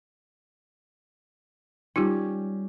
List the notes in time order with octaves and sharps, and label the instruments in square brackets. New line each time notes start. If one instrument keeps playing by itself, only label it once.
[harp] G3 C#4 [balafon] D#4 F4 G4